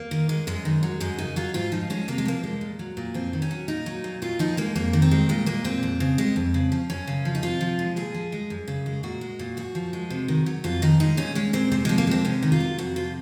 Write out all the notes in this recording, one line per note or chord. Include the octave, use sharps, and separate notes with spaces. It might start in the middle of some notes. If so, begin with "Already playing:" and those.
Already playing: A#3
D#3
G#3
F#2 G#3
D#3
F#3
F#2 G#3
C#3 D#4
F#3 F4
G#2 F4
F3 D#4
G#3 C#4
C3 A#3
G#3
F3 A#3
G#3
A#2
F#3
A#2
F2 C4
D#3
C#4
F#3
A#2 D#4
F#3
A#2
A#2 F4
F3 D#4
G#3 A#3
F2 A#3
D#3
C4
G#3
A#2 G#3
G#3 A#3
A#2 C4
F2
C#3
G#3
F2
C#3
F3
F#2 C#4
C#3
F3
D#4
C3 F4
F3
G#3
A#2 G#4
F3
G#3
F#2
C#3
G#3
A#2 F#4
G#3
A#2
F#2 F#4
F3
G#3
C3
D#3
F#3
F2 F4
D#3 D#4
G#3 D#4
A#2 C#4
G#3 C#4
A#2 C4
C3 C4
F3 G#3
A#3
G#3 C4
C3 C#4
D#3
F4
F#3
F2 F#4
C3 F4